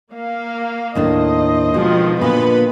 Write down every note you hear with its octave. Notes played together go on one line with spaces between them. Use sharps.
A#3 F5
D#2 A2 D4 C5 D#5
B2 D#3 F3 G#3
A#2 D3 B3 F4 B4 B5